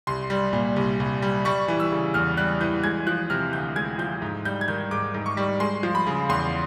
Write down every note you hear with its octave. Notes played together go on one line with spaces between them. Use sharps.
C2 C6
G3
A#2
C2
C2
G3
G3 C#6
E3
E6
C#3
E2 F6
G3 F#6
E3 G6
G#3 G#6
F3 F#6
C3 F6
D2 G6
G#3 G#6
F3 G6
G#2
G3 G6
G#6
D#3 G6
G#2 D6
G#2
C#6
G3
G#3 C6
F3
B5
C#3
E2 C6